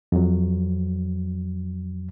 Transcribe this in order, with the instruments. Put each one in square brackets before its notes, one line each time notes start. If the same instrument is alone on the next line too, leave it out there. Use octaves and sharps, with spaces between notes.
[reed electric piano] F2 F#3